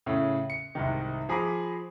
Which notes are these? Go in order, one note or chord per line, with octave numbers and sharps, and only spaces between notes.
A2 C#3
C#7
C2 G#2 D#3
F3 G#4 A#5 B5 D6